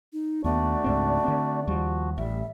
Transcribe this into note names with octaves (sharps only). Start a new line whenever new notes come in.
D#4
D#2 A3 B3 D4 F#4 D5
C#2 G#2 C4
D3 C4
D#2 F3 G3 F#4
A1 G3 E5